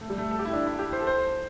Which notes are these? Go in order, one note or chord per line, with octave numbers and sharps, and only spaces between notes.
A3
G3
A3
A4
G4
E4
D4
E4
G4
C5
A4
C5